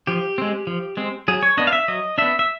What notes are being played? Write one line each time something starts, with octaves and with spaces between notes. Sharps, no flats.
F3 G4
G#3 C4
F3
G#3 C4
F#3 G#4
C#5
B3 D4 D#5
F5
E5
F#3 D#5
B3 D4 E5
E5